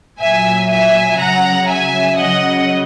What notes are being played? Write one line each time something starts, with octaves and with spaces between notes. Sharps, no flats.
A#2 F#3 E5 G#5
E5 G#5
C#3 F#3 F#5 A#5
E5 G#5
C#3 F#3 D#5 F#5